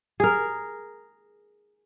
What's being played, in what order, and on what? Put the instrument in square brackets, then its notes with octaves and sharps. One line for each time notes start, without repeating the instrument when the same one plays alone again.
[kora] G#4 A#4